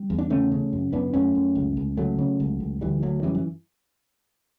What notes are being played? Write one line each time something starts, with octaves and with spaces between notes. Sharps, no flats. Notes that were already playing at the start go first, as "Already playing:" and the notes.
Already playing: G3
E2
D4
C#3 A3 C#4
C#3
F#2
F#2 B3 D4
F#2 A3 C#4
F#2
C#2
C#2
C#3 F#3 A3
C#3
C#2
C#2
D2 E3 G3
D2 F#3 A3
F#2 E3 G3
E3